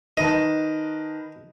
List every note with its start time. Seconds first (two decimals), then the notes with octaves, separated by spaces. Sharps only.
0.17 D#3 B4 D#5 A5